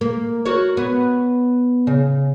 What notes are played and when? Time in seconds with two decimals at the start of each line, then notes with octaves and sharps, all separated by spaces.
0.01 A#3
0.45 F#4 A#4 C#5
0.77 B3 C#5
1.87 C#3